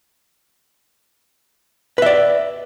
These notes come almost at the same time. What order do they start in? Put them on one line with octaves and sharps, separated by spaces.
B4 E5 D5